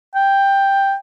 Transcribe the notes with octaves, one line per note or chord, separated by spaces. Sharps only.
G5